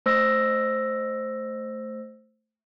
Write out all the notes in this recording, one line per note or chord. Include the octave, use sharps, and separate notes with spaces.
A3 C5 E6 A#6